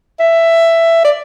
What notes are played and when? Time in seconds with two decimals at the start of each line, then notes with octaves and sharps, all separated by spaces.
0.20 E5
1.04 D5